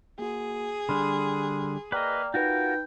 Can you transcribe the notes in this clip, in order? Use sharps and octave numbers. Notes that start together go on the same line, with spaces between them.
A#3 F#4 G#4
D3 G3 D4 B5 C6 F6
A#3 B4 D5 D#5 G5 A#5
D#4 F4 F#4 A#4 B4 G5